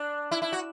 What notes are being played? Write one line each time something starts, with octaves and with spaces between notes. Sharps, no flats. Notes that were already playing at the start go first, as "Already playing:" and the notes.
Already playing: D4
E4
E4
F#4